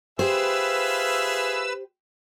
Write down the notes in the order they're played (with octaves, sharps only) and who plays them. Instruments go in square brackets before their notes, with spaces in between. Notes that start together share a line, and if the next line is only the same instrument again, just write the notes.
[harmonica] F4 G#4 E5 [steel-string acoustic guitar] G4 C5 [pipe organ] B4 E6